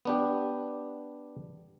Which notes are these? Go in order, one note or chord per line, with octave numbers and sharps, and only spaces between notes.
B3 D4 G4